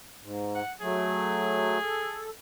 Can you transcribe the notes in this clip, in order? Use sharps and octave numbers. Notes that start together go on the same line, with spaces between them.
G#2
F#5
F#3 A3 G#4
A4